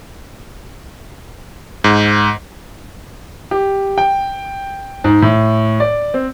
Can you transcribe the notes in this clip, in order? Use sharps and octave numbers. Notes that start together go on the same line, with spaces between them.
G#2
G4
G5
G#2
A2
D5
C4